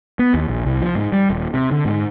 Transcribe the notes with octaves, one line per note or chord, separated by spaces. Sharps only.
B3
D#2
A#1
C2
F3
G#2
G3
D#1
C3
D3
G#2